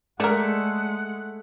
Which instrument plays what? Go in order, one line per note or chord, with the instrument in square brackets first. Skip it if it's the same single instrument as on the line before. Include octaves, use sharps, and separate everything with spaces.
[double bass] G#3 [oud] A3 D5 [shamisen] G#4 A#4 [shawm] F#5